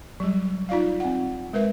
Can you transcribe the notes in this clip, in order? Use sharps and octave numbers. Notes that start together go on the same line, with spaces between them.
F#3 G3
D#4 F4 D5 F5
C4 F#5
G#3 A#4 B4 E5